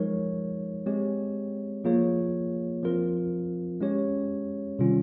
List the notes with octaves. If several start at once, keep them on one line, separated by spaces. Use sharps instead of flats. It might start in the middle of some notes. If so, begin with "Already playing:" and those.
Already playing: F3 G#3 D#4 A#4 C#5
G#3 C4 G4 C#5
F3 A#3 F4 G#4 C#5
F3 C4 F4 A#4
G#3 C#4 G4 C#5
C3 D#3 G3 C#4 F4